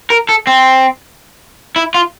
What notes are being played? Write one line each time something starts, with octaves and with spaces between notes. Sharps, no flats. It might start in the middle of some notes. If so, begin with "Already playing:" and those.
A#4
A4
C4
E4
F4